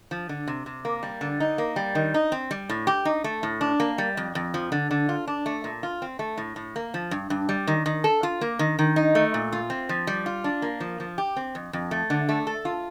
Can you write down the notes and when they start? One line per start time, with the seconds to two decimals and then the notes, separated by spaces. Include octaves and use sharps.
0.11 F3
0.29 D3
0.48 C3
0.66 C3
0.85 A#3
1.03 G3
1.21 D3
1.40 D#4
1.58 A#3
1.76 G3
1.95 D#3
2.14 D#4
2.32 C4
2.51 G3
2.69 A2
2.87 G4
3.05 D#4
3.24 A3
3.43 A2
3.61 D4
3.80 A#3
3.98 G3
4.17 F2
4.35 F2
4.54 F3
4.72 D3
4.91 D3
5.09 F4
5.27 D4
5.46 A3
5.64 A#2
5.83 F4
6.02 C4
6.19 A3
6.38 A2
6.56 A2
6.76 A#3
6.94 F3
7.11 G2
7.30 G2
7.49 G3
7.67 D#3
7.86 D#3
8.04 A4
8.23 F4
8.41 A#3
8.59 D#3
8.79 D#3
8.96 D#4
9.15 A3
9.34 A#2
9.52 F4
9.70 C4
9.89 F3
10.07 G3
10.26 F4
10.44 D4
10.62 A#3
10.80 F3
11.00 F3
11.18 G4
11.36 C4
11.55 F2
11.73 F2
11.91 A3
12.10 D3
12.29 A3
12.47 A4
12.65 F4